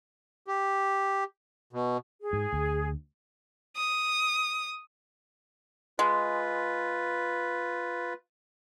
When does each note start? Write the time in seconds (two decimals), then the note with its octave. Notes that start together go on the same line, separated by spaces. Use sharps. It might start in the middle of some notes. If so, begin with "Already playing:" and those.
0.47 G4
1.73 B2
2.20 G#4
2.33 G#2
2.53 D2
3.76 D#6
5.99 G#3 F4 B4